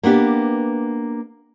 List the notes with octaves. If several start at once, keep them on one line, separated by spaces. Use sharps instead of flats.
A#3 B3 D4 G4